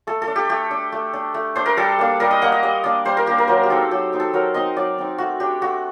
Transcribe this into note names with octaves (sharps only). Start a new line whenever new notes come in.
A3 A4
A4
D4
G4
A3 G4
D4
A3
D4
A3
D4 C5
A#4
G3 A4
A#3 D4
G3 A#4
D#5
A#3 D4 F#5
D#5
G3 D#5
A#3 D4 D5
G3 C5
A#4
A#3 D4 G4
A#4
F#3 C5
G4
C4 D#4 A4
F#3 G4
C4 D#4
A4
F#3 A#4
C4 D#4 D#5
F#3 D5
C4 D#4
A3 F#4
D4 G4
A3 F#4